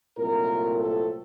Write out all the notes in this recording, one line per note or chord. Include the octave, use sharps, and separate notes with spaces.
C2 A#2 F#3 A3 C4 A#4
A4